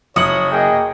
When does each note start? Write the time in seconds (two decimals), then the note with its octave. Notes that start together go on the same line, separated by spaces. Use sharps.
0.16 F#1 C#5 D#6 C#7 F#7
0.52 A#3 G#4 D#5 G5